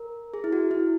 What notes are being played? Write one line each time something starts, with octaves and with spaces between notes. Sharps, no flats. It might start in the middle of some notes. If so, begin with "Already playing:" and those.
Already playing: A#4
G#4
E4
F#4
E4